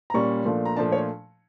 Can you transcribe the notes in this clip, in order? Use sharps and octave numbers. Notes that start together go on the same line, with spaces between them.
A#5
A#2 G3 C#4 C#6
A#2 F3 A3 D4
A#5
A#2 F3 A3 D4 A5
C#5